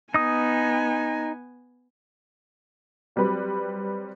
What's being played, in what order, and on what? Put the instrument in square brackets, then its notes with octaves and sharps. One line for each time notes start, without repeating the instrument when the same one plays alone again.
[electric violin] B3 G#5 [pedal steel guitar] D#4 D#6
[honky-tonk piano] F#3 G3 C4 B4